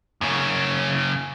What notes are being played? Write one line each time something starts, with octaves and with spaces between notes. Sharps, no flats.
F#2 C#3